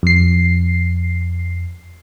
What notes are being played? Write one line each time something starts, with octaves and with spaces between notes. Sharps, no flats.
F2 C7